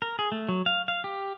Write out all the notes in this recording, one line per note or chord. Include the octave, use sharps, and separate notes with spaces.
A#4
G#4
A3
F#3
F5
F5
G4